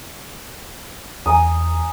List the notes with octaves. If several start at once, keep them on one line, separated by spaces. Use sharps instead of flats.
E2 G#5 A#5 D#6